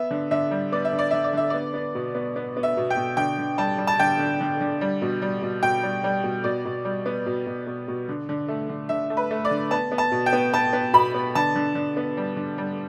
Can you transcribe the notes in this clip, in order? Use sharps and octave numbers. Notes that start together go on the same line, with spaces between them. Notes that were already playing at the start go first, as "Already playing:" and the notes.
Already playing: B3 E5
D3
D3 E5
G3
B3 D5
E5
D3
D5
D3 E5
D5
D3 E5
B3 D5
B3
B2
B3
B3
B3
E5
B2
G5
B2
D3 G5
D3
G3 A5
G3
A5
D3 G5
D3
D3
D3
G3
B2
G3
B2
B2 G5
G3
G3
B2
B2 D5
B2
G3
B3
B2
B2
B2
B2
D3
D3
A3
D3
D3 E5
A3
B4
A3
D5
D3
B3 A5
B3
A5
B2
G5
B3
B3 A5
B3
B2 B5
B3
D3 A5
D3
D3
B3
G3
D3
G3